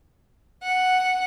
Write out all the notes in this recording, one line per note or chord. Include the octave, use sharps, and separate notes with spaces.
F#5